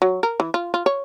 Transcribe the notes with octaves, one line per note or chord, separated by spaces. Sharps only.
F#3
A#4
E3
F4
F4
C#5